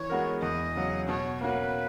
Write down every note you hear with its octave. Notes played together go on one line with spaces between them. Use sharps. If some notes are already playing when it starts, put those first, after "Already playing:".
Already playing: E3 C#5
G#3 B3 F#4 A#4
E2 D#5
C#3 F#3
B2 C#5
A#3 C#4 F#4 B4